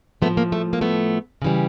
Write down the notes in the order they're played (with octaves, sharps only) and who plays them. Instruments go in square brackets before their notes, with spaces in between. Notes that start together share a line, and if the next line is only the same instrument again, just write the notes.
[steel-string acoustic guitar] A2 F3 A3 B3
A#3
A3
A#3
A3 B3
C#3 E3 G3